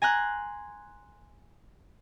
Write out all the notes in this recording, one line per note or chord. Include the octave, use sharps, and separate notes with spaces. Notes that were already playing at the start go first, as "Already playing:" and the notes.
G#5 A#5 C6 F#6